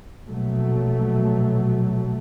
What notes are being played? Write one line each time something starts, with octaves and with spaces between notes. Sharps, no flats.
A#1 B2 F#3 A3